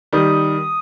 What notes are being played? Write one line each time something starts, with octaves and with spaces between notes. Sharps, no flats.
D#3 G3 D#6